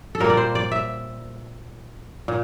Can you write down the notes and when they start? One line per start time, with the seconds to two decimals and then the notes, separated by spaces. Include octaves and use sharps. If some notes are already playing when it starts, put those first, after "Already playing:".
0.15 A4
0.20 A#2 G3 A#3 A#4
0.30 D5
0.37 C5
0.55 D5
0.72 E5
2.28 A#2